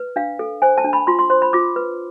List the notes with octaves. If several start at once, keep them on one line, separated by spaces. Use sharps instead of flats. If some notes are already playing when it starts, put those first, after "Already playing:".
Already playing: B4
D4 F5
A4
C5 G#5
A5
D4
B5
F4 C6
C6
C5 C6
B5
F4 D6
B4